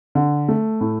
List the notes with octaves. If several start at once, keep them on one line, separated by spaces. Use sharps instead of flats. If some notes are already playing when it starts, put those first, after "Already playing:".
D3
A3
A2